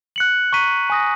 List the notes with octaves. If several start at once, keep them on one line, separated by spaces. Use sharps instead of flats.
F#6 C#7 F#7
A#5 C#6 F#6 B6 D#7
G#5 D#6 A#6